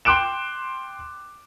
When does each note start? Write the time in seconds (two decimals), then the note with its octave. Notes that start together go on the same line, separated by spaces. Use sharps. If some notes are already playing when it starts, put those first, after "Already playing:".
0.05 G5 C6 D6 F#6 D7 E7